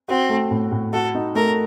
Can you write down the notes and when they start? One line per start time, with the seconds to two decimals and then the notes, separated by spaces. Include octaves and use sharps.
0.08 C4 F#4
0.30 A3
0.51 A2
0.71 A2
0.93 F#4 A4
1.15 D#4
1.35 A3 A#4